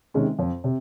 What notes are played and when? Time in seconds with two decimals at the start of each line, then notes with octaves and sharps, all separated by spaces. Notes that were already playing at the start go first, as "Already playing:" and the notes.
0.14 C3 D#3 G#3 C#4
0.39 F2
0.64 C3